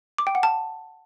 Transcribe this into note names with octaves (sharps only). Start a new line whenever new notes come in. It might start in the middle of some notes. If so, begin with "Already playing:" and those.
D6
G5
F#5
A5